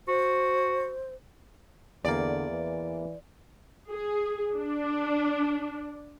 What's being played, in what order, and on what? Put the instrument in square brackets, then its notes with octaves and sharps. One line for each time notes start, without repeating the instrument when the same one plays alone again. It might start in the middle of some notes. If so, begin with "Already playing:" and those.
[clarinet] F#4 [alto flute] C5
[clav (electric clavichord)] E2 A#3 [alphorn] D3 [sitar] D5
[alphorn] E3
[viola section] G#4
D4